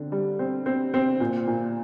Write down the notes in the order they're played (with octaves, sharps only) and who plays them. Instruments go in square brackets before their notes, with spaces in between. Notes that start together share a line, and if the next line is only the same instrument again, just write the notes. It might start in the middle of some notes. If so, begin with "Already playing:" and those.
Already playing: [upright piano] D3 C4
G3
C4
C4
C4
A#2
A#2